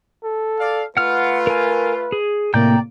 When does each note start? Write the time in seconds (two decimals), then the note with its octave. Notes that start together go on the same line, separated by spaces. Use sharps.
0.24 A4
0.59 D5 F5
0.97 A3 F4 B4 F#5 F6
1.47 A#4 G#5
2.12 G#4
2.54 A2 C3 A#3 D5 G5 A#5 G6